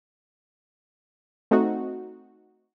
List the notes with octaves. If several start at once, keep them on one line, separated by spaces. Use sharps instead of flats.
A3 C4 D#4 F#4